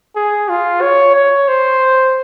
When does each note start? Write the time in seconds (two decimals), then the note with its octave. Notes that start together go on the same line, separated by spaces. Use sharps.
0.16 G#4
0.49 F4
0.82 C#5
1.15 C#5
1.48 C5